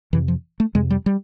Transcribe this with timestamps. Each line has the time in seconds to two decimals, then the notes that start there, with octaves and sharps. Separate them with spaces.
0.13 F2 C3 E3
0.28 F3
0.60 A3
0.75 F2 C3 G#3
0.90 G3
1.06 G3